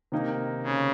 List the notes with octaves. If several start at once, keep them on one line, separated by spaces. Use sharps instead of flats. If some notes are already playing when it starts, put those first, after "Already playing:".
C3 D#3 A#3 D#4 A#4
C#3